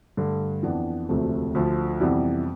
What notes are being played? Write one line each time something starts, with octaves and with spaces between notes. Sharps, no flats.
G2 D3 A3
F2 E3 B3 D4
E1 D2 C3 F3 A3
D2 D3 F3
F2 C3 E3 G3 B3